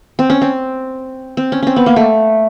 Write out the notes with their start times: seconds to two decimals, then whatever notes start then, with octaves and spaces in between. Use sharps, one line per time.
0.19 C4
0.30 C#4
0.41 C4
1.37 C4
1.52 C#4
1.62 C4 C#4
1.76 B3
1.86 A#3
1.96 A3